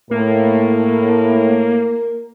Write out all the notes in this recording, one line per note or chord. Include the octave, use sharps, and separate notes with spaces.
A2 A#3 A#4